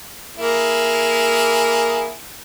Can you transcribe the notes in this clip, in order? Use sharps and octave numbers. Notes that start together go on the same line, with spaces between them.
A#3 E4 G#4